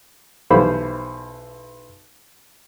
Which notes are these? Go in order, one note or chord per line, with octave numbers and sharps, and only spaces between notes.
B1 E3 G3 C5 F5 B5